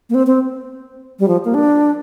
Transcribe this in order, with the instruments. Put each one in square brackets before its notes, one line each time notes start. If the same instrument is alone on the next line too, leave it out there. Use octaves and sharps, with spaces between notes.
[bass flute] A#3
C4
C4
G3
F3
A#3
D4